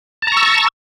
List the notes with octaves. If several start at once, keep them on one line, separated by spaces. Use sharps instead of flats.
A5 A#5 C#6 E6